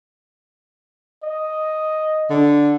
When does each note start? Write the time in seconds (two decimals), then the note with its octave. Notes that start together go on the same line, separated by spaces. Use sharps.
1.23 D#5
2.30 D3